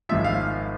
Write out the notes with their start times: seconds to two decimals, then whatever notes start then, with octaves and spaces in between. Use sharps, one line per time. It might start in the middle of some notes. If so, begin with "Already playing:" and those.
0.09 G#1 G#2 F3 E5
0.24 F5